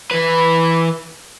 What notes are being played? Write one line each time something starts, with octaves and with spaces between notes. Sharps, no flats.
E3 B4